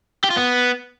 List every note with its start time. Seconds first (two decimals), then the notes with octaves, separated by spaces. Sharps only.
0.24 G4
0.30 F4
0.36 B3